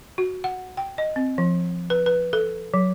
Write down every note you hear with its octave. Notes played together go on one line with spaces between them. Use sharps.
F#4
F#5
G5
D#5
C4
F3
B4
B4
A4
F#3